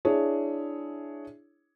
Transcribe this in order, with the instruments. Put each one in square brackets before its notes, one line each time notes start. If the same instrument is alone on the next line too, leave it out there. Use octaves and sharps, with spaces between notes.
[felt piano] D4 E4 G#4 C#5